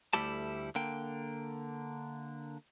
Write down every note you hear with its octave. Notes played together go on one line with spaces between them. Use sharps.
D2 G3 A3 E4 G4 A5
D3 A#3 G5